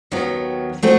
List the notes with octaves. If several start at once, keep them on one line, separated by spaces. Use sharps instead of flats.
D#2 D#3 F#3 B3
F#3 A3 C4